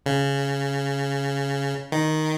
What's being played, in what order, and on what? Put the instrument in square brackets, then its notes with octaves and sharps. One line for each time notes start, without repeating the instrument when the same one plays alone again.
[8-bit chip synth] C#3
D#3